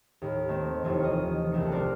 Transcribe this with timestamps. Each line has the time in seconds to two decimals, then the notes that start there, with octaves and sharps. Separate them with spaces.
0.22 D#2 A2 D#4
0.48 D#3 A3 A#3 C4
0.84 F1 D#2 E3 F4 C#6
1.04 D#5
1.52 E1 C2 A3 A#4 C#7
1.70 A#4 C5 D5 D6 F6 F#6